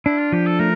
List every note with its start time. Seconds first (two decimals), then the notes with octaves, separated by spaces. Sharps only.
0.05 D4 E4
0.19 F4
0.32 F3 G4
0.46 A4
0.59 A3 A#4